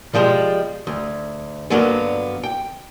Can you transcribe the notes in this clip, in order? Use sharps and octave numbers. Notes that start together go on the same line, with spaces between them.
B2 F3 G3 G#3
D2
G2 D3 F#3 A#3 B3
G5